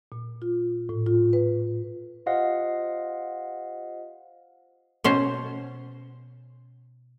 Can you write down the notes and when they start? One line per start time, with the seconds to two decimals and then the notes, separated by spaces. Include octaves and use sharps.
0.12 A#2
0.42 F4
0.89 A2
1.07 F4
1.33 B4
2.26 F4 G4 C5 D#5 F5 F#5
5.04 B2 C#4 C5